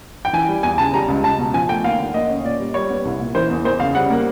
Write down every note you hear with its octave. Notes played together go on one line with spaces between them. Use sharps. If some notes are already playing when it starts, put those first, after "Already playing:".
G5
E3 G#5
G3
E2 G#5
C#3 A5
G3 A#5
C#2
C#2 A5
B2
F3 G#5
A3 G5
D#2 F5
D3
A#3 D#5
C#4
A#2 D5
G3
G3 C#5
B3
C2
A#2
E3 C5
E2
E2 C5
C#3 F5
G3 F#5
A#3